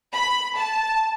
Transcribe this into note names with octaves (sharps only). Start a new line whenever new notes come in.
B5
A5